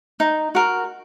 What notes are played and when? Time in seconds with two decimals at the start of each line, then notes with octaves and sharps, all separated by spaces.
0.20 D#4
0.55 F#4 A#4